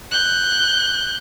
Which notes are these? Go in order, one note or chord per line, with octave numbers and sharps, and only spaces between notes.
F#6 G6